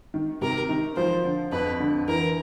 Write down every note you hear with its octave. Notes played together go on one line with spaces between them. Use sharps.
D#3
C3 A#4
D#3
F3 C5
D3
F2 B4
D3
E3 A#4